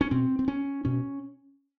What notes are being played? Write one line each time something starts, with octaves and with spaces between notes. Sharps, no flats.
C#4
B2 C4
C4
C#4
B2 C#4